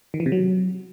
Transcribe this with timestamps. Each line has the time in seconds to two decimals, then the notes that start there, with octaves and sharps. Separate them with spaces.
0.14 D#3
0.20 E3
0.26 C3
0.32 F#3